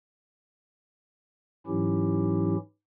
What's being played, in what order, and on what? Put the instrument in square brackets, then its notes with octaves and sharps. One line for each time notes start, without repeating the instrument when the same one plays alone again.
[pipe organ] G#2 E3 F#3 C#4 E4 G4